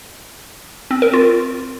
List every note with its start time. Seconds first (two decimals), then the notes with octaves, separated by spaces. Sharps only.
0.91 C4
1.02 A#4
1.13 F4